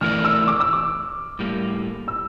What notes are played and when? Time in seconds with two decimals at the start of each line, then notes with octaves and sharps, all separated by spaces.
0.01 E3 A3 E4 A#4 D5 F6
0.25 E6
0.48 D6
0.60 E6
0.73 D6
1.39 A2 G3 A#3
2.08 E6